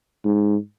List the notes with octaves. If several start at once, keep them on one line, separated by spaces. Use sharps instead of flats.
G#2